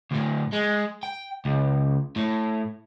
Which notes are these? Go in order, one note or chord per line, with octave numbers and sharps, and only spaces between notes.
D2 A2
G#3
G5
C#2
A2